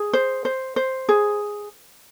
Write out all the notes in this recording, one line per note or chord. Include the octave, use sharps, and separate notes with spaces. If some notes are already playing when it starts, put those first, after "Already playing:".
Already playing: G#4
C5
C5
C5
G#4